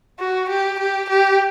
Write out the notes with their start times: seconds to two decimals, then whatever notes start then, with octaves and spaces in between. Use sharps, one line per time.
0.19 F#4
0.49 G4
0.80 G4
1.09 G4